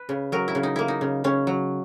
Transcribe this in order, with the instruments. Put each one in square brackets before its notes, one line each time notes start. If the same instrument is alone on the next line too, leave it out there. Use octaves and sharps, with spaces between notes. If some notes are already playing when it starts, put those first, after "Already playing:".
Already playing: [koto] B4
C#3
F#3 A#4
E4
C#3
D#4
A#3 E4
D#4
C#3
C#3 C#4
F#3